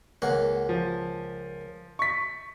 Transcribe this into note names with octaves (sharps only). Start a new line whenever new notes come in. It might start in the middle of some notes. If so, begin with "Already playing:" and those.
C#2 A#3 F#5
F3
C#6 B6